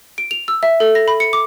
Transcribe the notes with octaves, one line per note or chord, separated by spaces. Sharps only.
D7
F7
E6
E5
A4
A#6
B5
C#7
D6